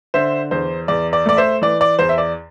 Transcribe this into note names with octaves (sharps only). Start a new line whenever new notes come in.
D3 C5 E5
E2 C5
E2 D5
D5
A3 D5
C5 E5
E3 D5
D5
E2 C5
E5
D5